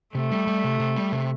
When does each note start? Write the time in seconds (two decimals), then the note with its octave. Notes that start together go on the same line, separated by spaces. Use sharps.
0.15 C3 A3
0.31 G3
0.47 G3
0.64 C3
0.80 C3
0.96 G3
1.12 C3